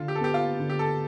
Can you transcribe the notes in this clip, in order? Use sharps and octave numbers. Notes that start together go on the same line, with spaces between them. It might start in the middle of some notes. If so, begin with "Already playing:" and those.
Already playing: D3 F4
G4
A4
B3 G4
F4
D3
G4
A4